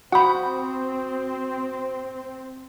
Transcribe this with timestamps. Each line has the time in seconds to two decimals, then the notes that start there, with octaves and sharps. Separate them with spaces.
0.12 C4 F#4 F#5 B5 D#6 G6